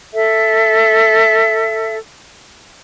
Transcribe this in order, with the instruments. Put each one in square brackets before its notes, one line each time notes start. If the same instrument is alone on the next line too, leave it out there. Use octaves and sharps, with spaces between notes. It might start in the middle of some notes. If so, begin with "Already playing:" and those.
[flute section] A4 E5